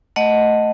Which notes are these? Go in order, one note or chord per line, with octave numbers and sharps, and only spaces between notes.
A3 D#5 F#5